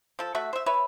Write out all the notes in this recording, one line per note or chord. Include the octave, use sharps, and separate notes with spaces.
F3 A4
A3 F#4 E5
C5 E5
B4 C#5 E5